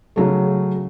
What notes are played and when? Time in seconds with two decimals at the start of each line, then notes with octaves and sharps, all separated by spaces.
0.16 C#3 F#3 A3